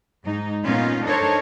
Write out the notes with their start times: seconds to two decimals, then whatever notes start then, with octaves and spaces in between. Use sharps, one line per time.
0.24 G#2 D#4
0.64 A#2 B3 C#4 D#4 F4
1.05 D4 D#4 A4 A#4 C5 C#5